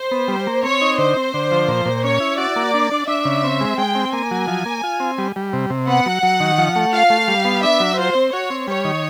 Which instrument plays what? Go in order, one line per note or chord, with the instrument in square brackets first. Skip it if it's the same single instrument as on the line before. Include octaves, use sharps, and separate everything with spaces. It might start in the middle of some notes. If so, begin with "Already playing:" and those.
Already playing: [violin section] C5
[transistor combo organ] B3
G3
A#3
[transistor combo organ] C4 [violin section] C#5
[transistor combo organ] D#4
[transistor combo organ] D3 [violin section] C5
[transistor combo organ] C4
D3
F3
A#2
A#2
[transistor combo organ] C#4 [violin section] C#5
[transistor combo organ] E4
[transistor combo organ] F#4 [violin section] D5
[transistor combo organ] A#3
D4
D4
[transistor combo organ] D4 [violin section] E5
[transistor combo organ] C#3
C4
G#3
[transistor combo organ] G#3 [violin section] G5
[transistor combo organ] C4
[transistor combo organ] A#3 [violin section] G#5
[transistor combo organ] F#3
F3
A#3
F4
C4
G3
G3
C3
C3
[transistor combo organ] B3 [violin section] F#5
[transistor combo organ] F#3
F#3
D#3
F3
A3
[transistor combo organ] F4 [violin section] F5
[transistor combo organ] A3
G3
B3
[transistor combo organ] D4 [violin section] E5
[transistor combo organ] F#3
[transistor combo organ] F4 [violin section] C5
[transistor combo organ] C4
[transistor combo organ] F#4 [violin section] C#5
[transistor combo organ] C4
[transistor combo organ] G3 [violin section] C#5
[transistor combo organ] D#3